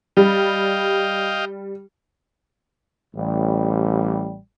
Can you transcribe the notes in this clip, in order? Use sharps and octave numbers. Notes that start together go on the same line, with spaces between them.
G3 D#5 F5 G5
A1 G3